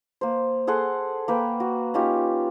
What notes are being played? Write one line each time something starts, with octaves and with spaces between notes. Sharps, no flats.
A#3 C5
G#4 A4 F#5 C6
A#3 B4 G5
F#4
C#4 D#4 F4 G4